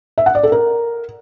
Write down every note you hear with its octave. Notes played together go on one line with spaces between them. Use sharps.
E5
F#5
D5
A4
A#4